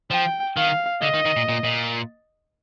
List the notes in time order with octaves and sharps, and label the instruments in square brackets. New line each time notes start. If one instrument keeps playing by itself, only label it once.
[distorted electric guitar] F3 [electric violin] G5
[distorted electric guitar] D#3 [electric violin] F5
[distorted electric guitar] D3 [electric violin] D#5
[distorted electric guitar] D#3
D#3
A#2
A#2
A#2